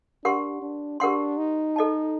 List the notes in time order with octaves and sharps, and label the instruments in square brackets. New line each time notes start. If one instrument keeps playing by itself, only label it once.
[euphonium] D4 [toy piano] G4 A#4 F#5 C6
[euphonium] D4
[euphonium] D4 [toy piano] G4 A#4 F#5 C6
[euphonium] D#4
[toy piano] A4 D#5 A5